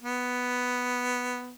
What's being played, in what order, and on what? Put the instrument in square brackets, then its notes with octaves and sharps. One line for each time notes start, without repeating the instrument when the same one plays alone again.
[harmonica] B3